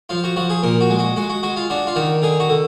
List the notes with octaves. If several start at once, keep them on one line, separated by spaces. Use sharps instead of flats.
F3 F4
F#4
F3 F#4
G#4
A#2 A#4
F#4
G#3
F#4
G#3 F#4
F#4
G#3 F#4
F4
D4 F#4
F4
D#3 F#4
D3 G#4
F#4
D3